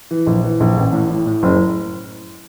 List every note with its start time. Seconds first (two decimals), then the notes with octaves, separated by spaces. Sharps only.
0.11 E3
0.27 A#1
0.43 E3
0.60 A#1
0.77 A1
0.93 A2
1.10 A2
1.26 A2
1.43 F#1